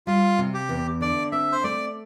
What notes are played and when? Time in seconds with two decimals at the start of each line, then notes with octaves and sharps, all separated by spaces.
0.07 G3 F4
0.38 C3
0.54 G4
0.69 E2
1.01 D3 D5
1.32 C4 E5
1.52 C5
1.64 A3 D5